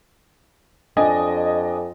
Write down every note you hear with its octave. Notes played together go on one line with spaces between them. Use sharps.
F2 D4 D#5 G#5